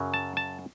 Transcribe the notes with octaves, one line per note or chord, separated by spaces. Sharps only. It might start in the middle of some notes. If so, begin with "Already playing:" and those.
Already playing: F#2 C#3 F#3
A5
A5